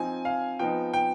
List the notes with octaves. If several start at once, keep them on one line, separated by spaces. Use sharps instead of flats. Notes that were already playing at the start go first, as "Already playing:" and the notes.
Already playing: F3 C4 D#4 G#5
F5
F3 B3 D#4 G5
G5